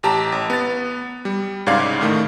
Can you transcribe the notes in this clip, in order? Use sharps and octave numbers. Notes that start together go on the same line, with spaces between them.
A1 G4 A5 A#5
A1
B3 A6
G3
C2 G#2 C#3 D5 F5 G#6
A2 D#3 A3